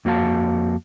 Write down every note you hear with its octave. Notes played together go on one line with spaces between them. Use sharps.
F2 A#3 F#4 F5 A5